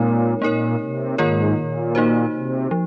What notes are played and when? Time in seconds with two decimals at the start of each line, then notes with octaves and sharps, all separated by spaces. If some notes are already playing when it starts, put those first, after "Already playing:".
Already playing: A#2 G#3 C4 D#4 A#4 C#5
0.41 A#2 A#3 D#4 A#4 C#5
0.80 C3
1.18 G#2 D#3 A#3 F4 A#4 C#5
1.57 A#2
1.95 A#3 D#4 F#4 C5
2.33 C3
2.71 F3